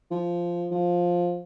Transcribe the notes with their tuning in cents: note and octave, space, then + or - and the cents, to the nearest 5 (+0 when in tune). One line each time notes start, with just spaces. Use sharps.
F3 -5
F3 +10